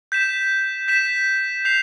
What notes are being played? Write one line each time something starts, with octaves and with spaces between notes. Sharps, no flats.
G6 B6 E7
G6 B6 E7
G6 C7 F7